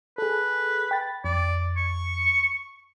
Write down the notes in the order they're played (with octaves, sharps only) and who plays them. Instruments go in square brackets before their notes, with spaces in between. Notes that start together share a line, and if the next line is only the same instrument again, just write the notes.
[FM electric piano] G#4 A4 [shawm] B4
[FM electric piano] G5 B5 A6
[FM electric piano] F2 [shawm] D5
[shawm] C#6